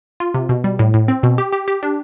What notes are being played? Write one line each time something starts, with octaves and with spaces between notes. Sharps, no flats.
F4
C3
B2
G3
A2
A2
C4
B2
G4
G4
G4
D4